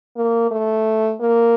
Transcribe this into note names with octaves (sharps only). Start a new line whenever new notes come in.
A#3
A3
A#3